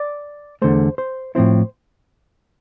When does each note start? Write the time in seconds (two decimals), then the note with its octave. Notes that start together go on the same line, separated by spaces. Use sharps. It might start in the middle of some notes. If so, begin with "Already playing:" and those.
Already playing: D5
0.62 E2 D3 A3 C5
0.98 C5
1.35 A2 F3 C4 E4 C5